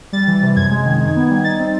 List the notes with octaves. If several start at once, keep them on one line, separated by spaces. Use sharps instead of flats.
G3 A6
E3
C3
F#2 G#6
G#3
D#3
D#4
B3
G3
D#4 A6
C4